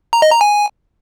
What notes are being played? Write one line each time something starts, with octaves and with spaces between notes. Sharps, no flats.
A#5
D#5
A#5
G#5